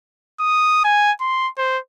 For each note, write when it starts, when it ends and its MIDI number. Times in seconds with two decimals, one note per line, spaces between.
0.40 0.84 87
0.84 1.11 80
1.21 1.49 84
1.58 1.78 72